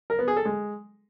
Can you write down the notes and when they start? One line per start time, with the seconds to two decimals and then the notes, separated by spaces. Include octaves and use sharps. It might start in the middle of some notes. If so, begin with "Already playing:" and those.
0.10 A#4
0.19 B3
0.28 G#4
0.37 A4
0.45 G#3